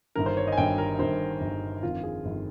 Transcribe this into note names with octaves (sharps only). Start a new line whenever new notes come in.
G1 G2 D#3 A#4
C5
C#5
D#5
G#5
G1 G2 D#3 G5
A#4
G1 G2 D#3 C5
G1 G2 D#3
G1 F2 D#3 F4
G#4
G1 F2 D#3